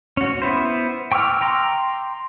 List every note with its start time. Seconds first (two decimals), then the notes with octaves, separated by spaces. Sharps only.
0.17 C#4 F#4
0.42 B3 E4 C5
1.12 G5 C#6 D6 E6 F6
1.41 G5 A#5 C6 D6